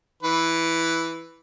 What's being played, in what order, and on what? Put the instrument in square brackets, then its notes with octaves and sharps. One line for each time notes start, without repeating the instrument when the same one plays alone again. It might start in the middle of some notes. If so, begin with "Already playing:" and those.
[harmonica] E3 B4